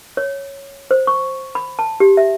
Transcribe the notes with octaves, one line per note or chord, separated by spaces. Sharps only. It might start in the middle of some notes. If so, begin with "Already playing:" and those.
C#5
C5
C#6
B5
A5
G4
E5